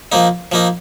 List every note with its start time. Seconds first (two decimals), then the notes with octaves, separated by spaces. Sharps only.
0.12 F3 A#3 D#4
0.52 F3 A#3 D#4